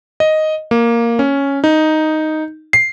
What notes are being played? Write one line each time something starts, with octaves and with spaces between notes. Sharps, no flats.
D#5
A#3
C#4
D#4
C7